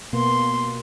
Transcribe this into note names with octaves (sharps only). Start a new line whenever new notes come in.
B2 A#3 B3 C6